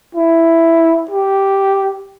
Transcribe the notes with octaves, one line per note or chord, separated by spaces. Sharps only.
E4
G4